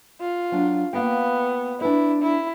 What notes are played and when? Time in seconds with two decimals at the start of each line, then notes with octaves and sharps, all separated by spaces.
0.21 F4
0.52 F#3 D4
0.93 A#3 B3 F5 G5
1.81 D4 E4 B4
2.22 E4